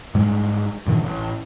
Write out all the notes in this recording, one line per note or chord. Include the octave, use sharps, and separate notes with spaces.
G#2 G3 G#3
G2 A#2 D#3 E3
A1